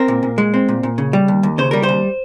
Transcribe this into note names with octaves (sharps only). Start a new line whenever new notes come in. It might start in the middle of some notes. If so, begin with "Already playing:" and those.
Already playing: C4 A#4
A#2
A#2
G#3
C4
A#2
A#2
C#3
G3
D#2
D#2
C#3 C5
G3 A#4
C5
D#2